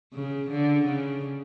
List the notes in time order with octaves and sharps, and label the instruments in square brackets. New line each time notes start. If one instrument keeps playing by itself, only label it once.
[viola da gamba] C#3
D3
C#3